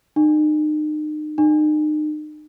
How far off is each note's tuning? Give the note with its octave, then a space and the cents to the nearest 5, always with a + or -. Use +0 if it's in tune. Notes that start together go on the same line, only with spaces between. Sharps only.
D#4 -35
D#4 -35